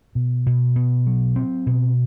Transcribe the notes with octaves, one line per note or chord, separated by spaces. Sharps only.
B2
B2
B2
F#3
C4
B2